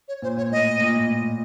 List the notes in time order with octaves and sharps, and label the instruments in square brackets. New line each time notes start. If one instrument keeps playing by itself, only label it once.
[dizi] C#5
[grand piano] A#2 [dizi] C5
[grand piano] A#2 [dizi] C#5
[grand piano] A2 [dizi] D#5
[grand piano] A#2
A2
A#2